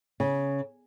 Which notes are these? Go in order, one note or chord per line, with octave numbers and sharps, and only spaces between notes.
C#3